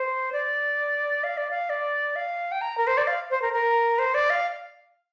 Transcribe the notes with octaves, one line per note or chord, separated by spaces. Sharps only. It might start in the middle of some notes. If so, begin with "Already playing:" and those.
Already playing: C5
D5
F5
D5
F5
D5
F5
G5
A#5
A#4
C5
D5
F5
C5
A#4
A#4
C5
D5
F5